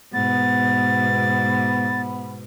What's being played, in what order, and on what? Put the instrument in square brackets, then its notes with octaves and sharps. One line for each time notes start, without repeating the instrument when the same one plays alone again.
[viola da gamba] G#2 B2 [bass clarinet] B3 [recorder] A6